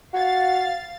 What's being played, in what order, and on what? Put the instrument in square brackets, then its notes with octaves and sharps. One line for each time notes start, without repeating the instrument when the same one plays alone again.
[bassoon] F#4 [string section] F5 A6